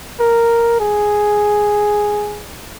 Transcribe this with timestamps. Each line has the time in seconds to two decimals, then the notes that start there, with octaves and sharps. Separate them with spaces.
0.20 A#4
0.80 G#4